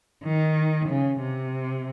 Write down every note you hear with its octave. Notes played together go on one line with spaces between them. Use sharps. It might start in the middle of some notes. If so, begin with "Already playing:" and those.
D#3
C#3
C3